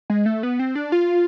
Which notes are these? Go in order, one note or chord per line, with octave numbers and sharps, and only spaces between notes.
G#3
A3
B3
C4
D4
F4